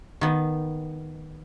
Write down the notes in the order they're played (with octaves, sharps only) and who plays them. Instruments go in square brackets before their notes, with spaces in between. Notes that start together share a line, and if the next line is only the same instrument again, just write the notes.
[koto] D#3 B3